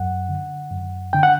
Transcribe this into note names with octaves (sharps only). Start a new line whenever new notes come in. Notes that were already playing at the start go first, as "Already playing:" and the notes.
Already playing: F#2 F#5
D3
F#2
D3 G5
F#5